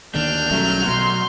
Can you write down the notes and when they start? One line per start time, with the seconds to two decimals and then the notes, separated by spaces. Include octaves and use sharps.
0.15 D2 D#3 A#3 D4 F6 G6
0.51 B1 F#3 G3 A3 C#4
0.86 B2 B3 C6